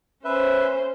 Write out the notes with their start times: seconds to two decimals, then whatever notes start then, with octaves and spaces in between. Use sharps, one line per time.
0.25 C#4 B4 C5 E5